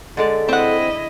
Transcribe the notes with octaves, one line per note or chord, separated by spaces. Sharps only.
D3 G#3 A4 D5
C4 E4 D#5 F#5